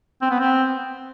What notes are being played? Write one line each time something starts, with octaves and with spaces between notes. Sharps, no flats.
C4
B3
C4